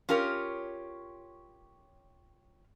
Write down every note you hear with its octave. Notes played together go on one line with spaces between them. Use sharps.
C#4 F4 G4 A#4 C#5